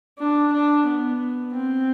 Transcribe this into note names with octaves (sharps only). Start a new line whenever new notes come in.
D4
D4
B3
C4